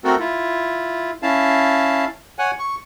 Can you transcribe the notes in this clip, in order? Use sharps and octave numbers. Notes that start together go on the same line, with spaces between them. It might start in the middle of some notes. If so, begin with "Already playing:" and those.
A3 C4 F#4 A4 A#4
E4 F4
C#4 E4 F5 A5
C#5 F#5 G#5
C#6